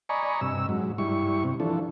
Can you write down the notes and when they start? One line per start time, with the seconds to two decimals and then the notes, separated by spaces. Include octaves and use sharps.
0.09 D5 D#5 G#5 A#5 B5 C#6
0.41 G2 C3 E6
0.69 G#2 F#3
0.98 G2 G3 E4 C#6
1.44 C3
1.60 E3 F3 D4 A4